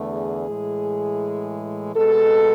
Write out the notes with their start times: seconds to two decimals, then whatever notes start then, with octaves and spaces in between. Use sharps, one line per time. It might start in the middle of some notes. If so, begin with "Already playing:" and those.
Already playing: E2 D3 A3
0.13 G#4
0.49 A2 E3 G#3
1.96 B2 G#3 A4